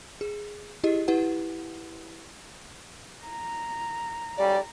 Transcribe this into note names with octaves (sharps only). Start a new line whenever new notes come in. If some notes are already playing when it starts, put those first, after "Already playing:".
G#4
E4 G4 G#4 D#5
E4 G4 B4 F#5
A#5
B1 C#3 G3 D5